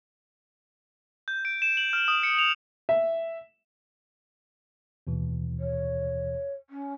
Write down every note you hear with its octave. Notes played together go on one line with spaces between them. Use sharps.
G6
D7
E7
F#7
F6
D#6
C#7
F7
E5
D#2 B2 E3
C#5
C#4